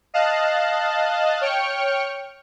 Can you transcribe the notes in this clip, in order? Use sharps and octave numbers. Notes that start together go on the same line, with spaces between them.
D#5 F5 A5 F#6
C#5 G5 F6 C#7